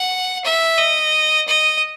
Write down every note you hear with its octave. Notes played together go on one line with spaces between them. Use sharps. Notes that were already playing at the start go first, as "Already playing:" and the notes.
Already playing: F#5
E5
D#5
D#5